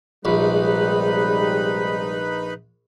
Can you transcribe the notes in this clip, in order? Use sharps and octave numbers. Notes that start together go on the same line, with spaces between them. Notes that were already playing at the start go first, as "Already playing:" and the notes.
A#1 C3 G3 G#3 D#4 B4 B5